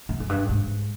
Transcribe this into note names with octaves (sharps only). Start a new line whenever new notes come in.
F#2
F#2
G2
G#2